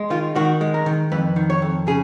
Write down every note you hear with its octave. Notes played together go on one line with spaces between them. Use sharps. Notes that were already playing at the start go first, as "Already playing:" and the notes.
Already playing: G#3
D#3 F4
D#3 F#4
G#3
A#4
D#3
F2 B4
D#3
C#5
F2
C#3 G#4